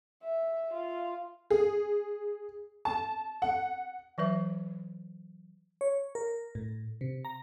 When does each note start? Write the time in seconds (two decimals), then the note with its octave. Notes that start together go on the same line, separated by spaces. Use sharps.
0.23 E5
0.73 F4
1.50 G#4
2.85 A5
3.42 F#5
4.18 E3 F#3 B4 E5
5.81 C#5
6.15 A#4
6.55 A2
7.01 C3
7.25 A#5